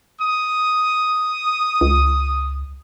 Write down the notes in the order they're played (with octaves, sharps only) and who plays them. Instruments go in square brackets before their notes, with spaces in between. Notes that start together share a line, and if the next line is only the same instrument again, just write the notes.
[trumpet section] D#6
[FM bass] C#2